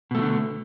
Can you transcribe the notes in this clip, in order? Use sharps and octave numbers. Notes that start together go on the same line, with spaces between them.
B2 D3 F3 A3